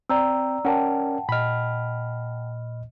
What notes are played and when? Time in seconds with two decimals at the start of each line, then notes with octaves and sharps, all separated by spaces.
0.09 C4 D5 G5 A#5 E6
0.65 C#4 A#4 D5 F#5 G5 A5
1.29 A#2 D#5 B5 F6